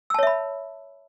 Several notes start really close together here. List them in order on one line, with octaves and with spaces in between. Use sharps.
E6 A5 C#5 E5 B5